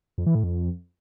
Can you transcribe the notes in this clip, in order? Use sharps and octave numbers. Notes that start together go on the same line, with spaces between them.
F2
E3
A2
F2